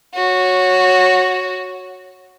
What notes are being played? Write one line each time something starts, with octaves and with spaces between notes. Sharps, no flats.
F#4 C#5